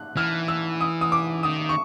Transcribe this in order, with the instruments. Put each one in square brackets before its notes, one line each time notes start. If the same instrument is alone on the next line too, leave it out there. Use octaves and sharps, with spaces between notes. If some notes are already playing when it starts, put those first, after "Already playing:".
Already playing: [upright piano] F#6
[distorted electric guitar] E3 [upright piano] F6
[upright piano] E6
D#6
D#6
D6
[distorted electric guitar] D#3 [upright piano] D#6
[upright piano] C#6